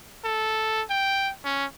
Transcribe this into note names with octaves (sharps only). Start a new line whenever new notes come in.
A4
G5
C#4